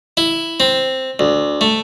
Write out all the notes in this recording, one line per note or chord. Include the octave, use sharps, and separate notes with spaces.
E4
C4
D2
A3